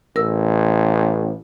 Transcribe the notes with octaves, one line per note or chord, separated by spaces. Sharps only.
A1 A#4 E6